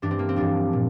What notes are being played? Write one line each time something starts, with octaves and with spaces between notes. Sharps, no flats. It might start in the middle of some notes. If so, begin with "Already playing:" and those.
G2 E3 D4
C4
A#3
C4
G2 F3 D4
A#2